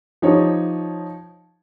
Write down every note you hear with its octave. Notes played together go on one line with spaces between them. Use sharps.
F3 D#4 G4 C#5